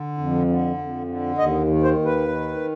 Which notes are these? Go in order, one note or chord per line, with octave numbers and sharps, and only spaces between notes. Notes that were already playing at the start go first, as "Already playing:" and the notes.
Already playing: D3
F2
D3
F2
D3
D#2 D#5
D#3
C5
D#2
B4
D#3